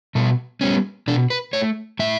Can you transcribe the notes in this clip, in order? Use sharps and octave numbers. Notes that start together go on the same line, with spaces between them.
B2 A4
G3 B3 C#4
B2 D4
B4
A3 C#5
A2 E5